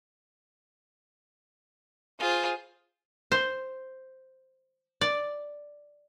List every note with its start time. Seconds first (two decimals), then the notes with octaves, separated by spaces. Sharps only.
2.19 F4 G#4 C5
3.32 C5
5.01 D5